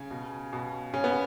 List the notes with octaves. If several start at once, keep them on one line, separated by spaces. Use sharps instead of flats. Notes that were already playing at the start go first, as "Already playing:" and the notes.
Already playing: C#3 C#4
B2
B2
C#3 C#4
B3